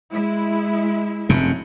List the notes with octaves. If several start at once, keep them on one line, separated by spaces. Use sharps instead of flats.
G#3 E4
F1 F#2 C3